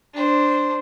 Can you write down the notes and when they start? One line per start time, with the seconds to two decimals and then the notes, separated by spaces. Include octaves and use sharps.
0.14 D4 C5